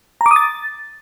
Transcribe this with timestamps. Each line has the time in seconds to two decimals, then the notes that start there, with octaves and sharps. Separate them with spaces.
0.21 A#5
0.26 D6
0.31 D#6
0.36 A6